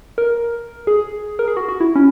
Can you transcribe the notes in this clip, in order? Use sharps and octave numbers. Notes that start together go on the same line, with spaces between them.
A#4
G#4
A#4
G#4
F#4
F#4
E4
C#4